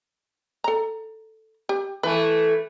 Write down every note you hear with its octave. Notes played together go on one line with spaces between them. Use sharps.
A4 A#5
G4
E3 A3 B4